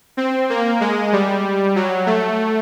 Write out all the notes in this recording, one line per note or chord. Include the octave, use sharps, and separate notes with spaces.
C4
A#3
G#3
G3
F#3
A3